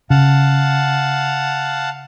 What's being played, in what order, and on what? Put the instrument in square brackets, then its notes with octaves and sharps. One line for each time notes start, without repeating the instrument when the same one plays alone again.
[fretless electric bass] C#3 [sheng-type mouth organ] F5 F#5 A5